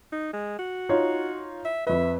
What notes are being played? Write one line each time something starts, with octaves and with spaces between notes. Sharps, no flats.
D#4
G#3
F#4
D#4 F4 C#5
E5
F2 B4 E5